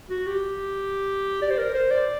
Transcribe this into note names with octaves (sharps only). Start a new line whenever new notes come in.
F#4
G4
D5
C5
A#4
C5
D5